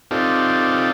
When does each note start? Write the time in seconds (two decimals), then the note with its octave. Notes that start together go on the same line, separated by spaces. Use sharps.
0.11 C4 D#4 F4 G4 A4 D5